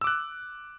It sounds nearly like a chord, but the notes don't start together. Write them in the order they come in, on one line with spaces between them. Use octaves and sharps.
E6 D6 F#6